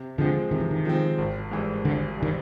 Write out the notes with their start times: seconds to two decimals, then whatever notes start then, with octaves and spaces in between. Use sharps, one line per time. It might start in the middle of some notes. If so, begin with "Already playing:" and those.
Already playing: C3
0.18 D3 F3 G#3 C4
0.51 C3 D#3
0.60 E3
0.71 D#3
0.85 F3 G#3 C4
1.18 G#1
1.51 G#2 E3 G3
1.85 G#1 D3
2.18 D#3 E3 G3